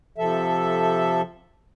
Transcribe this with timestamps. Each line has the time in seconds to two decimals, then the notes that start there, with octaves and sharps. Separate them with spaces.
0.18 C3 F3 A4 E5